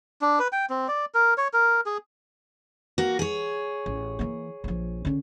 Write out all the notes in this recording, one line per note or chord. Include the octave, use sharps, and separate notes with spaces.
D4
B4
G5
C4
D5
A#4
C#5
A#4
G#4
A#3 F#4
G#4 C#5
A1
E3 A#3
A#1 F3
D3 C#4